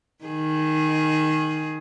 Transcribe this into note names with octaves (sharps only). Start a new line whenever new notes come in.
D#3 G#4